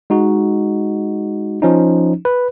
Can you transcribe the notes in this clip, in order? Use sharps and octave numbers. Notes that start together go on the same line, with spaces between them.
G#3 D#4 F#4
F3 C#4 D#4
B4